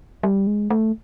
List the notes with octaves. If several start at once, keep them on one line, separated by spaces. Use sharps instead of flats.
G3
G#3
A3